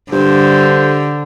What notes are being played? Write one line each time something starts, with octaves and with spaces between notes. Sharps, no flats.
G2 D3 G4 A4 C5